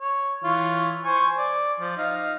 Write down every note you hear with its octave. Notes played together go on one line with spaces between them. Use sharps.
C#5
E3 F4 C#5
C5 G#5 C#6
D5
F3
D#4 F5